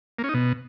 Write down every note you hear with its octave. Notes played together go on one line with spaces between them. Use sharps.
A#3
C#4
D#4
B2